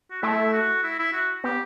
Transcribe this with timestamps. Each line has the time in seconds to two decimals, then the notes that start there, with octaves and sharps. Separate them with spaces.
0.11 F#4
0.22 A3 E4
0.53 F#4
0.83 E4
0.99 E4
1.13 F#4
1.44 B3 G4